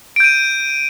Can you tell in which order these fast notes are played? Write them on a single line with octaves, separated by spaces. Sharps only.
D7 G6 D#7